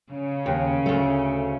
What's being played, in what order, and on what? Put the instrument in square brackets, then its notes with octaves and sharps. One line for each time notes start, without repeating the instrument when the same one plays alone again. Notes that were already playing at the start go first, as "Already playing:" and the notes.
[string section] C#3
[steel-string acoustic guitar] D#2
D2 A3